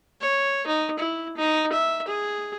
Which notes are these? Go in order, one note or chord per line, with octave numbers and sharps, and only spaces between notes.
C#5
D#4
E4
D#4
E5
G#4